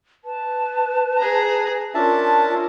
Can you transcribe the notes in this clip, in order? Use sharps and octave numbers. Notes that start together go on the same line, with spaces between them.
B4 A5
G#4 A#5
C#4 D4 F4 A#4 E5 A5